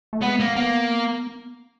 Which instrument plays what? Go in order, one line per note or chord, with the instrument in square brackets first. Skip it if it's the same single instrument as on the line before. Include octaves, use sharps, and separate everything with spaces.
[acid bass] A3
[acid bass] G#3 [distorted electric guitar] B3
[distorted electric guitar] A#3
[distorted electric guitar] A#3 [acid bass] B3